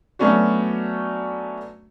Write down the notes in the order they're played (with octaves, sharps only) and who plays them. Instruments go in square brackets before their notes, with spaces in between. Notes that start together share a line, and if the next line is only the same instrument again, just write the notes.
[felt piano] F#3 A3 B3 C#4 D4 F#4